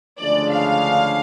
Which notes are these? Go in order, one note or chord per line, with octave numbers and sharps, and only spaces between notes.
D2 C#3 F3 G#3 D4 D5
F5